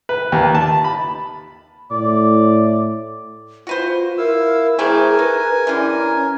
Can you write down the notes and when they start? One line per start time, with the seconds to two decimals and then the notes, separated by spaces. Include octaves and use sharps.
0.09 B4
0.32 D#2
0.55 A5
0.84 B5
1.91 A2 D5
3.67 F4 F#4 B4 C5
4.18 E4 A#4 F5 E6
4.79 E3 A3 C4 G#4 A#4 G#5
5.19 D#4 B4
5.67 D3 E3 G3 C#4